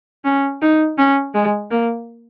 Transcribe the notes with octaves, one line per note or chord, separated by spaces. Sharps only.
C#4
D#4
C#4
G#3
A#3